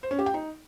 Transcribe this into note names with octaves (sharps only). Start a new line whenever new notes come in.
C5
C#4
G4
G5
D#4